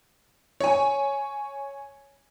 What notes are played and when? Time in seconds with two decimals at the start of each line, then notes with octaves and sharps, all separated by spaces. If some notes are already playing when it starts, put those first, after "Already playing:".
0.60 C#5 G#5